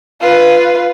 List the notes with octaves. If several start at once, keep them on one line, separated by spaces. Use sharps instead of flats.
F4 B4